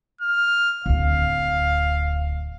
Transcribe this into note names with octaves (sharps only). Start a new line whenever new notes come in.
F6
D1 D2 F5